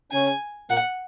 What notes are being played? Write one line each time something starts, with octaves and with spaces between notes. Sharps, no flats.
C#3 C#4 G#5
A#2 A#3 F#5